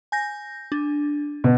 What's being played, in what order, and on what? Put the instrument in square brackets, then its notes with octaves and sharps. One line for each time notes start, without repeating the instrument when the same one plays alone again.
[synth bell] G#5 G6 A#6
D4
[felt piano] B2